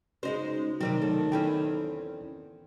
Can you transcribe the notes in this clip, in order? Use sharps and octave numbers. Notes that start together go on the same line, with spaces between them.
C#3 G#3 D#4 F#4 C5
C3 D#3 F#3 G3 C4 A#4
A1 F#3 A3 A4
E2 C4 C#4 E4 A4 G5